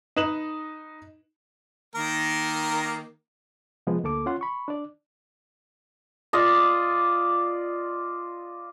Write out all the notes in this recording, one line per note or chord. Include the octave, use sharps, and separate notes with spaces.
D#4 B4 E7 F#7
D#3 A#3 A#4
C3 F3 G#3 B3
D2 A#3 A4 D6
C#4 F4 F#5 C6
B5 C#6
D4 D5
F4 D5 D#5